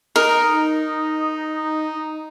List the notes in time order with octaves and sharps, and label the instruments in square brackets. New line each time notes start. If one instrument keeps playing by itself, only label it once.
[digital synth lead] D#4 [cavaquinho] A#4